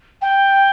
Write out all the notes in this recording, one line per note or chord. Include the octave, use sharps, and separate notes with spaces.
G5